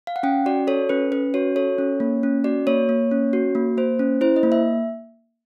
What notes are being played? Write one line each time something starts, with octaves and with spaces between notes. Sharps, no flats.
F5
F#5
C#4 G5
F#4 D5
A4 C#5
C#4 B4
C#4 B4
F#4 C#5
A4 C#5
C#4
A#3
C#4
F#4 D5
A#3 C#5
A#3
C#4
F#4
A#3
A#3 C5
C#4
E4 C5
D#5
A#3
E5